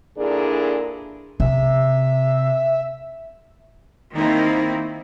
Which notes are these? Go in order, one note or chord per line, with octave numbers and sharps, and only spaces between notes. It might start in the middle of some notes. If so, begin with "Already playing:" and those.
A#2 D3 D4 E4 G#4 A#4
C3 E5
D#3 A#3 C4 D#4 E4